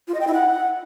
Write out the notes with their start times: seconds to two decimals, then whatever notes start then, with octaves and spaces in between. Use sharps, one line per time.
0.08 F4
0.14 D#5
0.21 G5
0.27 E4
0.34 F#5